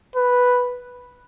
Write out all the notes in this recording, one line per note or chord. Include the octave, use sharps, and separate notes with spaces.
B4